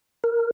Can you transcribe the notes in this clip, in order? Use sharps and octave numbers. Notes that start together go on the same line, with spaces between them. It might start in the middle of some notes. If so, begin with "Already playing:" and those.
A#4